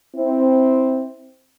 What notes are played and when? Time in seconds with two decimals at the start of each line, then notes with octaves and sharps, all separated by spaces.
0.16 C4 E4